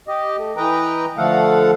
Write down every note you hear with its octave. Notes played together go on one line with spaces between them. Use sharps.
G4 D#5
A3
E3 B4 D#5 G5 A#5
D3 F3 A3 A4 F5 F#5